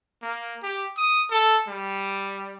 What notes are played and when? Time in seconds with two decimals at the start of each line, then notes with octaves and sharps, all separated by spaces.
0.22 A#3
0.63 G4
0.97 D#6
1.31 A4
1.68 G3